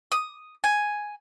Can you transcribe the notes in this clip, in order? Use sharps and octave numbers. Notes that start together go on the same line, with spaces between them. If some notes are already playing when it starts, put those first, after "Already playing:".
D#6
G#5